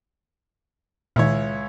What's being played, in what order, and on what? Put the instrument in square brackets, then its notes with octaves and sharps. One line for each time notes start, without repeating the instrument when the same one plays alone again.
[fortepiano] C#2 E4 C#5 [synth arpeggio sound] A#2 D#3